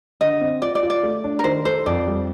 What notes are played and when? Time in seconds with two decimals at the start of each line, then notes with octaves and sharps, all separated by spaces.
0.21 D3 D#5
0.41 C4
0.62 F4 D5
0.75 D5
0.83 F4
0.90 D5
1.03 A3
1.24 D4
1.39 A#4
1.44 D#3 C5
1.65 A4 C5
1.86 F2 D5
2.07 G3